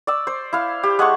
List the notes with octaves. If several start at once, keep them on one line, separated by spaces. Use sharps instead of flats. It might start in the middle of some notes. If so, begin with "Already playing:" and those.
D5 E6
C5
E4 F5
G4
G#3 F#5 A5 C#6